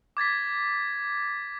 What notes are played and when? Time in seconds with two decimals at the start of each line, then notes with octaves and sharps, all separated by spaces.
0.17 D6 G#6 A6 B6